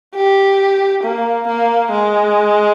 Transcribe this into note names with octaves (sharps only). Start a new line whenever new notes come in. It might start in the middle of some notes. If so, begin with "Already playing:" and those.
G4
A#3
A#3
G#3